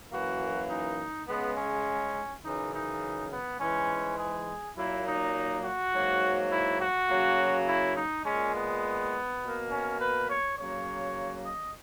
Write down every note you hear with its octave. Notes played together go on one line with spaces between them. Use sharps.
F#2 E3 A#3 F#4
D#4
C#3 G#3 B3
C#4
F#2 C#3 E3 D#4
D#4
B3
G#2 E3 G#3 C#4
G#4
A#2 F#3 A#3 E4
D#4
F#4
G#2 F#3 A#3
E4
F#4
C#3 F#3 A#3
E4
D#4
A#2 G#3 C#4
B3
B2 A#3
C#4
B4
C#5
C#3 F#3 A#3 C#5
D#5